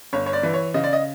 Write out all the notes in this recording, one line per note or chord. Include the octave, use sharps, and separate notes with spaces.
G1 C#5
C#5
D5
E3
C#5
C#3 D#5
D5
D#5